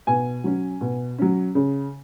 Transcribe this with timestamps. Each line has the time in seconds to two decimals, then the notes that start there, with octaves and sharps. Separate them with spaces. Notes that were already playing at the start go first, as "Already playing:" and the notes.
0.07 B2 G#5
0.44 F#3 C#4
0.81 B2
1.18 F#3 C#4
1.55 C#3